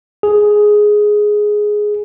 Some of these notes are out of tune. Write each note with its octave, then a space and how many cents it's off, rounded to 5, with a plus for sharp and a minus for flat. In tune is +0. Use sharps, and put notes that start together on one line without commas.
G#4 +5